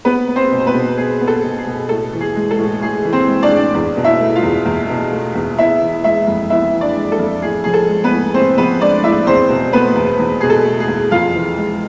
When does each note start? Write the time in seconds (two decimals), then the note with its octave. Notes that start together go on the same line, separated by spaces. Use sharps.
0.05 B3 B4
0.28 B3
0.36 C4 C5
0.51 B2
0.60 C5
0.66 B3 B4
0.74 B2
0.97 B3 G#4
1.21 B3
1.28 A4
1.43 B2
1.58 G#4
1.67 B2
1.89 A2 A4
2.13 E3
2.21 G#4
2.36 G#3
2.51 A4
2.58 A2
2.82 A2 G#4
3.05 E3
3.13 C4 C5
3.28 G#3
3.43 D4 D5
3.51 A2
3.75 E2
3.97 B2
4.04 E4 E5
4.21 A3
4.35 F4 F5
4.43 E2
4.66 E2
4.90 B2
5.12 A3
5.35 E2
5.58 B3 E4 E5
5.82 E3
6.04 G#3 E4 E5
6.28 F2
6.50 B3 E4 E5
6.73 E3
6.81 D4 D5
6.96 G#3
7.12 A4
7.19 F2
7.42 A2 G#4
7.64 F3 G#4
7.74 A4
7.89 G#3
8.04 B3 B4
8.11 A2
8.34 A2 C4 C5
8.57 F3 B3 B4
8.81 G#3 D4 D5
9.04 A2 E4 E5
9.27 E2 C4 C5
9.49 B2
9.73 A3 B3 B4
9.96 E2
10.19 E2
10.41 B2 G#4
10.50 A4
10.65 A3
10.80 G#4
10.88 E2
11.11 F2 F4 F5
11.34 E3
11.57 G#3